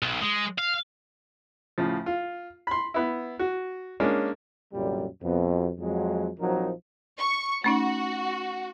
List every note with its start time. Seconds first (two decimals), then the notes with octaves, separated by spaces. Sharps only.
0.02 B1
0.21 G#3
0.59 F5
1.78 A2 C#3 F3
2.06 F4
2.67 B5 C6
2.94 B3 E4
3.39 F#4
4.00 G#3 A#3 C#4 D4
4.73 C2 F#2 A#2 D3 G3
5.22 F2 B2
5.80 F2 F#3 G#3
6.39 A#1 F3 F#3 C4 D#4 A#4
7.19 C#6
7.64 A3 C#4 D#4 F#4